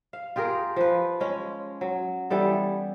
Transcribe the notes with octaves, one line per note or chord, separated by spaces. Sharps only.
F5
F4 G4 G#4 A#4
F3 B4
G#3 C#4
F#3
E3 G3 B3 A4